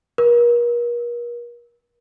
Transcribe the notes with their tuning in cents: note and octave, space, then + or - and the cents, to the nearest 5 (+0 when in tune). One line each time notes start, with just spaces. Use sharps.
A#4 +40